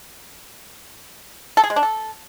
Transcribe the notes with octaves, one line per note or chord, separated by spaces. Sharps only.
A4
G#4
G#3
D4
A4